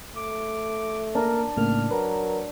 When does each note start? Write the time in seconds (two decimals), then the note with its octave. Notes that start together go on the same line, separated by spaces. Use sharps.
0.16 A3 D6
1.15 A#3 D4 A#4
1.57 A2 C#3 A#3 F6
1.91 F#3 A#4 B4